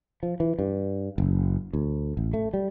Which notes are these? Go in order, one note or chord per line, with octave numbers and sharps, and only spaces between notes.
F3
E3
G2
F#1
D2
A1
A3
G3